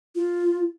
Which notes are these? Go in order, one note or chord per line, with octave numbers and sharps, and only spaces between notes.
F4